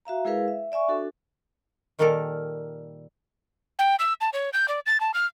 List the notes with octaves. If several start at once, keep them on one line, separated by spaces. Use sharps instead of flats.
F#4 E5 F5 A#5
G#3 E4 G#4 A#4 B4 F5
E5
D5 E5 G#5 C#6
D4 F#4 A4
A#2 D#3 G3 A#3 A4 A#4
G5
E6
A5
C#5
G6
D5
A6
A5
F6